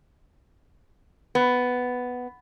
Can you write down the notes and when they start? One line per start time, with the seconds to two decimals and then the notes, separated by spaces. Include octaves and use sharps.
1.35 B3